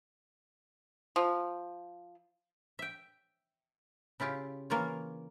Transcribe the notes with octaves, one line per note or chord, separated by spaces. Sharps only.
F3
E5 G5
C#3 E4 F4 G4
E3 A#3 F4 C#5